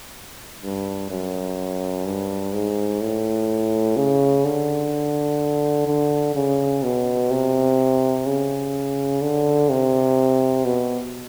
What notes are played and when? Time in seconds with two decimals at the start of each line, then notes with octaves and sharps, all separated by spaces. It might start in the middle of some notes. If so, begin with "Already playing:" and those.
0.63 G2
1.10 F#2
2.06 G2
2.53 G#2
3.01 A2
3.97 C#3
4.45 D3
5.87 D3
6.35 C#3
6.83 B2
7.31 C3
8.26 C#3
9.22 D3
9.70 C3
10.65 B2